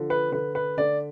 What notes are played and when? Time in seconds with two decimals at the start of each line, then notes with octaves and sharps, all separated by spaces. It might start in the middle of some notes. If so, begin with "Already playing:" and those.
Already playing: D3 F3
0.10 B4
0.32 D3 B4
0.55 B4
0.77 D3 D5